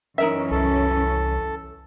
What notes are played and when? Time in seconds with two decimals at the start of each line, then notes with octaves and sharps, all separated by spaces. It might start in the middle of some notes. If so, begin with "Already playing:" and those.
0.18 F#2 E3 C#4 D#4 A#4 E5
0.51 C2 A4